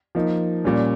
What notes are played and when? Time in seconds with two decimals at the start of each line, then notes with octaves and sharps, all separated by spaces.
0.15 F3 A#3 D#4
0.64 A#2 G3 C#4